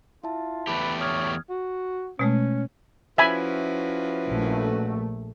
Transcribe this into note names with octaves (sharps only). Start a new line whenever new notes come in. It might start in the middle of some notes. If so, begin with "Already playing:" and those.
E4 F4 E5 A5
E2 A3 G4 B4
C#5 D#6 F6 G#6
F#4
B2 G#3 A3 C#4
F3 C#4 E4 F#4 B4 E5 G#5 B5
A#1 A3